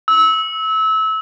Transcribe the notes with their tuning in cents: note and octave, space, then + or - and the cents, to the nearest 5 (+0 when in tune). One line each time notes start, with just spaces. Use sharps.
E6 -25